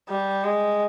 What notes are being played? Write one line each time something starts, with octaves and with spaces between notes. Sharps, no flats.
G3
G#3